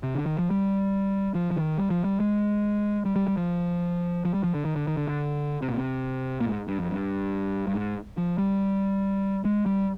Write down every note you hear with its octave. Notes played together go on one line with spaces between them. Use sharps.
C3
D3
D#3
F3
G3
F3
F3
D#3
G3
F3
G3
G#3
G3
G3
G3
F3
F3
G3
F3
D3
D#3
D3
D#3
D3
D3
C3
A#2
C3
A#2
G#2
G2
F2
G2
G2
G#2
F3
G3
G#3
G3